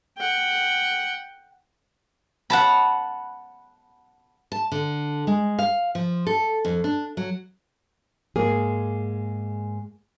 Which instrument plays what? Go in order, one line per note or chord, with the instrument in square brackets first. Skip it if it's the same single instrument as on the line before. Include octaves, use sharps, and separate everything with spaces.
[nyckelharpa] F#5 G5
[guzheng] F#5 A5 B5
[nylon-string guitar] A5
D3
G#3
F5
F3
A4
F2
D4
F#3
G#2 G#3 A#3 G#4